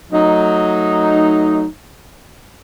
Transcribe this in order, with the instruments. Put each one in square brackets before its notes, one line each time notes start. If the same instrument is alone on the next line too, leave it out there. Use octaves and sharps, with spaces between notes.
[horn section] F#3 A3 D#4